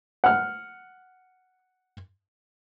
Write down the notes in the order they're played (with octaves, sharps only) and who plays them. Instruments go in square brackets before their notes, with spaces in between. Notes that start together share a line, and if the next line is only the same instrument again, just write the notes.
[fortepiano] F#5 F6